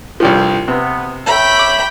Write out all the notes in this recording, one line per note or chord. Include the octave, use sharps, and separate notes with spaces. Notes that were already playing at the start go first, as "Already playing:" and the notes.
C2 G2 F3
C3 B3
C#5 E5 G5 B5
D6